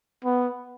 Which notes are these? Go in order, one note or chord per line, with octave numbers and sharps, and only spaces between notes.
B3